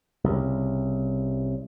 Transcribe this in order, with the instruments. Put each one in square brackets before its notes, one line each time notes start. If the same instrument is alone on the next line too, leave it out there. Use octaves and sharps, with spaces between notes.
[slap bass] C2 C#3